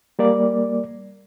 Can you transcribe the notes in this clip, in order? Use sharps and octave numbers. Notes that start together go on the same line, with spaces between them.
G3 A#3 D5